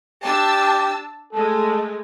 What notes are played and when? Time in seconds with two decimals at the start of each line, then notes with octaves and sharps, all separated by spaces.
0.23 D4 G4 A5 E6
1.33 G#3 A3 A4